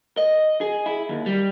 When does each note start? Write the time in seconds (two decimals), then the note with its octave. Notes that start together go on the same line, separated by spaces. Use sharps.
0.17 D#5
0.61 G#4
0.86 E4
1.09 D#2
1.26 G3